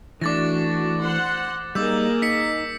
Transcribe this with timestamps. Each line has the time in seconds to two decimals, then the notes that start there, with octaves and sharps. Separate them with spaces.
0.21 E3 A3 D4 F#4 D6 A6 A#6
1.02 C5 F#5 C6
1.75 G3 A#3 D#4 G#4 A#4 D6 E6 G6
2.22 D#4 B6 C#7